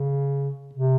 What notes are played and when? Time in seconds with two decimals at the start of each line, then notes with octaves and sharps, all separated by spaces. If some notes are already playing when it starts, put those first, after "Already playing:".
Already playing: C#3
0.75 C3